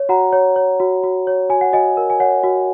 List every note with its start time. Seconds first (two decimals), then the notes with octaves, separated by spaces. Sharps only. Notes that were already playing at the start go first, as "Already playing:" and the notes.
Already playing: C#5
0.09 F#4 F#5 A#5
0.33 C#5
0.56 C#5
0.80 F#4
1.04 F#4
1.27 C#5
1.50 F#4 G#5
1.61 F#5
1.73 F#4 D#5 G#5
1.97 A#4
2.10 G#5
2.20 C#5 F#5
2.43 F#4